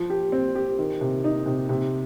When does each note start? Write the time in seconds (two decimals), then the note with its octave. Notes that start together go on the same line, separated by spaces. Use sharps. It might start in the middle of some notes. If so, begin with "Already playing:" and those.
Already playing: F3
0.10 G4
0.32 C4
0.55 G4
0.79 D#3
1.01 C3
1.24 D#4
1.46 C3
1.69 C3